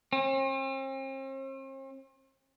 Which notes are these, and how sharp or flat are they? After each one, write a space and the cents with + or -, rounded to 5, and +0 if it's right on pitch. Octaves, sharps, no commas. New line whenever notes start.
C4 +45